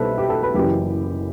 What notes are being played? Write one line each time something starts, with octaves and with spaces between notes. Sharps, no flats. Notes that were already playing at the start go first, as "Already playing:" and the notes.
Already playing: C2 B2 A4 B4 C5 E5
G4
A4
B4
F#1 F#2 E3 G4